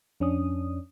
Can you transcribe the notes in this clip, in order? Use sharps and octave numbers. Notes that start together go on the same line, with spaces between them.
F2 C#4 D4 D#6